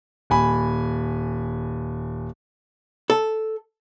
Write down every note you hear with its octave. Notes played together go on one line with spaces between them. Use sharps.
D#1 G#5 B5
A4